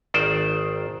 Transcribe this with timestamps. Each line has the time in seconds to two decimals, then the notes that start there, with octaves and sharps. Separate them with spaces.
0.14 G#1 D#3 C5 D5